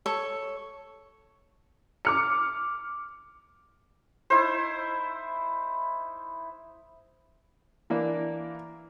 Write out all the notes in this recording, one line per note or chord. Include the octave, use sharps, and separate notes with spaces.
A4 C#5 C#6
D6 F6 C#7
D#4 E4 C5
E3 A#3 D4